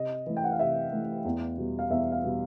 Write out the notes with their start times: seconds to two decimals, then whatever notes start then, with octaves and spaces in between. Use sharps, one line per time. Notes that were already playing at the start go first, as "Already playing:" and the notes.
Already playing: C3 D#5
0.26 E3 A3
0.37 G5
0.44 F#5
0.52 F5
0.59 C3 E5
0.92 E3 A3
1.25 E2
1.58 B2 G3
1.79 F5
1.90 E2 E5
2.12 F5
2.24 B2 G3